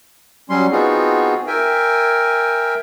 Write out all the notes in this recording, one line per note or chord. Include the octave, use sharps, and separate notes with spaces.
F#3 G3 C#4 C6
B3 C4 D#4 F4 F#4 G#4
A#4 E5 G5 G#5